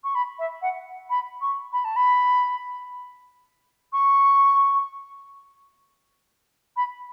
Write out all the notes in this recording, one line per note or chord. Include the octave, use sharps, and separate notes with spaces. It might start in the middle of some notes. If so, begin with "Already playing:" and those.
C#6
B5
E5
F#5
B5
C#6
B5
A5
B5
C#6
B5